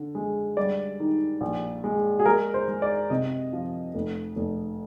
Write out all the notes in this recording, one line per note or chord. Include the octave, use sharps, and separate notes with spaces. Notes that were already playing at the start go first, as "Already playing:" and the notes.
Already playing: D3
G#3
G3 D5
D#3
A#1
G#3
G#4
G#3 A#4
C5
G#3
D5
C3 D#5
F3
F1
F1